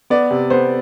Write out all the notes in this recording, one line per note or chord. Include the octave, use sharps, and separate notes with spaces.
B3 D5
C3
B3 C5